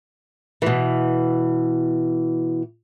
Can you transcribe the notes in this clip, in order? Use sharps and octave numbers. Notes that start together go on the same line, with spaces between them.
B2 E3